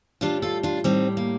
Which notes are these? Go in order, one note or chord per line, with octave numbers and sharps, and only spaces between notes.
A2 G3 D4 F4
F4 A4
D4 F4
A2 G3 C4 D#4
A#3